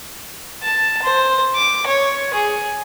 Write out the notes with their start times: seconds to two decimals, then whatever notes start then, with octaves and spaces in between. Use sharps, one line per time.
0.63 A5
1.03 C5
1.56 D6
1.87 C#5
2.34 G#4